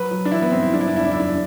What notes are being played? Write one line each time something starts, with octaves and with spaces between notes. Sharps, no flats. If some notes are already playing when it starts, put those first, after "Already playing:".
Already playing: F#3 B4
F#3
D4
E3 E4
B3
G2 C4
E4
F#3 D4
E4
D4
E2 E4
D4
E4
F#2
D4